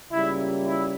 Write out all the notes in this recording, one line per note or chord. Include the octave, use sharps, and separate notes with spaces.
C#2 C#3 G3 A#3 E4
E4